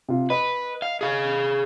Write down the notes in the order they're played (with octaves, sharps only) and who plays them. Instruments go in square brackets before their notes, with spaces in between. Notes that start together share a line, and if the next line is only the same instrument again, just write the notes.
[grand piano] C3 F4
[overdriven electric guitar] B4 [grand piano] D#5
[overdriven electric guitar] F5
G#4 F5